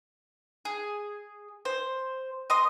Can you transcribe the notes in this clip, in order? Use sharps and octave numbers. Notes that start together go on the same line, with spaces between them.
G#4
C5
D#5 C6 D#6